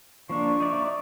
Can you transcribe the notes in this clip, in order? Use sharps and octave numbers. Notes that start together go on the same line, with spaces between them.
F3 A#3 D4 C#6
D#4 D5 E5